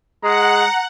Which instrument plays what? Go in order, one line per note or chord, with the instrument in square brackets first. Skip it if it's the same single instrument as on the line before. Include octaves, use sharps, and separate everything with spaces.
[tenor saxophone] G#3 [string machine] F#5 [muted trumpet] A#5